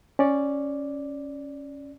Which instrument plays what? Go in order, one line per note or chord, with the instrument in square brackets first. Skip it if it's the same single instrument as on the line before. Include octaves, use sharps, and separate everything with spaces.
[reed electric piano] C#4 D5